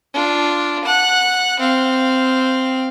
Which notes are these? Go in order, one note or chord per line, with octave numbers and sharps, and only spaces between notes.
D4 F4
F#5 F#6
C4 F5